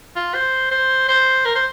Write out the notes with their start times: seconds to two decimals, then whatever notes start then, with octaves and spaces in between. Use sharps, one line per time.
0.16 F4
0.34 C5
0.71 C5
1.08 C5
1.45 A#4
1.55 C5